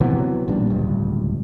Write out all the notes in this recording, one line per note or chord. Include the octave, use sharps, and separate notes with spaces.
C3 E3 F#3 B3
A1 A#2 G3 D4
D1 C#2 G2